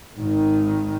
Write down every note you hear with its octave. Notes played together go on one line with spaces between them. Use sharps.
G#1 D#3